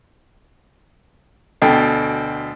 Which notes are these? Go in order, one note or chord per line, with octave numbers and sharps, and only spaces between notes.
D2 B2 A4 G5